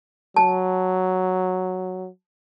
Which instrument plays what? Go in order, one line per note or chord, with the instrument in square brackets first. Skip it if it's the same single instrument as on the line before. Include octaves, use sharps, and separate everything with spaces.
[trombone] F#3 [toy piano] A5